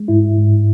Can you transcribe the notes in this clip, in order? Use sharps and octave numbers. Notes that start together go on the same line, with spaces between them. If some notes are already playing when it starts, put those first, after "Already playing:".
Already playing: G#3
G#2 E4
G#2